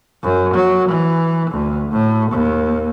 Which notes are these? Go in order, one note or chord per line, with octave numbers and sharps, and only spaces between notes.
F#2
F#3
E3
D2
A2
D#2